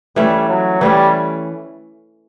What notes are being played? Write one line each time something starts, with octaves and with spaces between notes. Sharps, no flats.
E3 G3 A3 C#4
F#3
E3 G3 A3 C#4